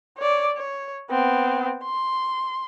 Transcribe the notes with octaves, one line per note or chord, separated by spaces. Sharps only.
C#5 D5
C#5
B3 C4
C6